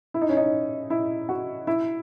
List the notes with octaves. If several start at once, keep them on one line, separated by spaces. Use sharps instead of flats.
E4
D#4
C#4
D#4
E4
F#4
E4